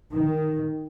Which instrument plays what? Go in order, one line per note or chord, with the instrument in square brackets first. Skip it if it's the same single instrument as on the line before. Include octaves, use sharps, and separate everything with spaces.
[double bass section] D#3